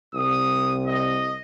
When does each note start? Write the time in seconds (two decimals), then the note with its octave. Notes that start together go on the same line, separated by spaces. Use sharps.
0.14 C2 D#6
0.87 D#5